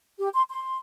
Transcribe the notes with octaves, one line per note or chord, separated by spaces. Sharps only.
G4
C6
C6